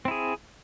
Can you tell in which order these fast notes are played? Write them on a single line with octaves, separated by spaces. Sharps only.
C4 E4 G#4